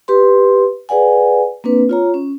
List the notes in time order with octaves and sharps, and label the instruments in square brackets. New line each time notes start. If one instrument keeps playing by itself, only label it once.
[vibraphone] G4 B4 C6
G#4 B4 D5 F#5 G#5
A#3 C4 D4 B4
F4 C#5 A#5
C#4